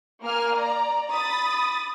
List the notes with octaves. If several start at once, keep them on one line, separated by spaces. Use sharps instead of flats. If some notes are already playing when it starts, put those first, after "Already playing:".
A#3 G#5 F6
D5 A#5
B5 D#6 A6